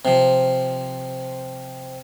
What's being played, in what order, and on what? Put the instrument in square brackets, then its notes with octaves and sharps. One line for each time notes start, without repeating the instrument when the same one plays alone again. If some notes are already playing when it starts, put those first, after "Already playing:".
[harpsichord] C3 F3